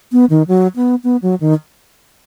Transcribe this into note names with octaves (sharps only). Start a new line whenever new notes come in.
B3
D#3
F#3
B3
B3
F#3
D#3